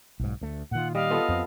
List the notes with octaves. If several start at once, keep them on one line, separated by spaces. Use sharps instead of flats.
B1 G#2
D2 A3
A#2 D#3 F4 F#5
G3 D#5 F5
B3 F4 A4
F2 C4